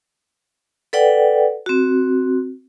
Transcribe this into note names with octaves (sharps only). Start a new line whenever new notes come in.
A4 B4 D5 F#5 G5
C4 F#4